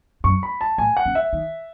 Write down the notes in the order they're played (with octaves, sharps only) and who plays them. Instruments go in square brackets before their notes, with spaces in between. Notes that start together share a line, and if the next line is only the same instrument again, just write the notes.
[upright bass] F#2 [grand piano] C#6
[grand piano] B5
A5
[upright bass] A2 [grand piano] G#5
[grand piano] F#5
[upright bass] C#3
[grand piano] E5
[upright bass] D#3